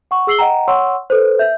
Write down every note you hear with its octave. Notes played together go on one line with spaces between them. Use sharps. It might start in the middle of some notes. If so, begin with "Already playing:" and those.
F#5 C#6
G#4 E6 C7 F#7 G7
D#5 F#5 G5 A#5
C#5 F#5 C6 C#6 E6
A4 B4 C5
E5 G6